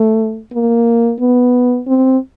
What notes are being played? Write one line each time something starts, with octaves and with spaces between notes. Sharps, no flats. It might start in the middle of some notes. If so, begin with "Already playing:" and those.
Already playing: A3
A#3
B3
C4